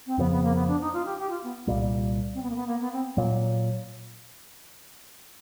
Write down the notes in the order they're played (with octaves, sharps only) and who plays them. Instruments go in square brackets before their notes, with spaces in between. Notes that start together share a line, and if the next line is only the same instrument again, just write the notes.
[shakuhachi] C4
[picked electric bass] F2 C#3 F3 [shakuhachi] B3
[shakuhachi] B3
A#3
B3
D4
D#4
F4
G4
G4
F4
B3
[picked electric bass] C2 A#2 G3
[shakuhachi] C4
B3
A#3
B3
A#3
B3
C4
[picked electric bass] A#2 F#3